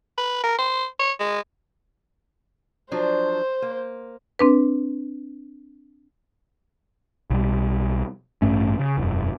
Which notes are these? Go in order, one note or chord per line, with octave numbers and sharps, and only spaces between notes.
B4
A#4
C5
C#5
G#3
F3 F#3 D4 C5
A#3
C4 D4 B4
B1 G3
A1 G2 A3 C#4
C#3
E1 F#2